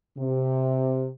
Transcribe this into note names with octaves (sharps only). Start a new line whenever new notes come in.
C3